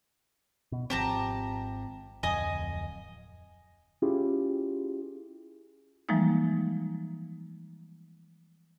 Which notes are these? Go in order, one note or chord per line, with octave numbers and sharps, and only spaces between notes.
B2
G#1 F3 C4 G4 A5 A#5
D1 F2 D#5 G#5 D#6
C#4 E4 F4 G4 G#4
E3 F3 G3 G#3 A#3 D#4